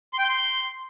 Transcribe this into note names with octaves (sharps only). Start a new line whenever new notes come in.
C6
G5
G6
C6